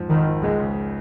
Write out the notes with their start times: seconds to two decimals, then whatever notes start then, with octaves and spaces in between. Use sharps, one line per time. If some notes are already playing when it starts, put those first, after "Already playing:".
Already playing: F2 G#2 F3
0.10 G#1 D#3
0.27 F3
0.43 C#2 G#3
0.60 C#3